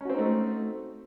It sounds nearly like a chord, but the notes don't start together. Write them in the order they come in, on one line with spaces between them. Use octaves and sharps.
C#4 F#4 C4 D#4 A3